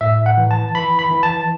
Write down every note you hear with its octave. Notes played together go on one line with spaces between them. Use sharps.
A2 E5
F#5
E3
A5
E3 B5
B5
E3
A5